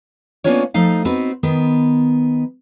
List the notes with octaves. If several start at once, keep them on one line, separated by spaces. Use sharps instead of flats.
A#3 B3 C#4 D4 F4 C#5
F3 A3 D#4 F5
B3 C4 D#4 F#4 B4
D#3 B3